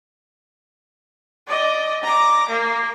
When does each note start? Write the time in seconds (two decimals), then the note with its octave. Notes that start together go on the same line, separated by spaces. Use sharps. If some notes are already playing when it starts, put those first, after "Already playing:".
1.47 D5 D#5
2.04 A#5 D6
2.49 A#3